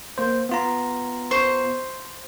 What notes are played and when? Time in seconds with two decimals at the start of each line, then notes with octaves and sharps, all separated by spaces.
0.18 A#3 C5
0.49 B3 F4 A#5
1.31 C5 C6 C#6